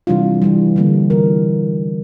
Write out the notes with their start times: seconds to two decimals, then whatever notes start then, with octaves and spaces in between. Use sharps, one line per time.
0.07 C3 E3 G3 D4 F4
0.42 C3 E3 G3
0.76 D3 G3 A#3
1.10 C3 E3 A#3 F4 A#4